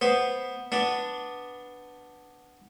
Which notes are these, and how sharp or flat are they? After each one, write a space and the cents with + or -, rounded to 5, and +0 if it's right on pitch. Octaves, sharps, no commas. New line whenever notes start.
B3 +0 C5 +0
B3 +0 D4 +0